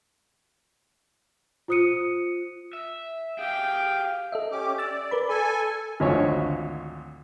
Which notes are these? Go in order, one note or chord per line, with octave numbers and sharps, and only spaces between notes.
F4 C5 D#6 F#6 C#7 D#7
E5
G4 G#4 F5 G5
A4 D#5 E5
C#4 G4 D6
D5 E6 A6
A#4 B4 B5
A4 G#5 B5
G#1 D2 F3 C#5